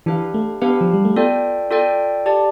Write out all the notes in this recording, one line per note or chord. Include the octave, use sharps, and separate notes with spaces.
E3 D4 G4 B4 F5
A3
B3 D4 G4 B4 F5
F3
G3
A3
B3 F4 A4 D5 G5
F4 A4 D5 G5
G4 D5 A5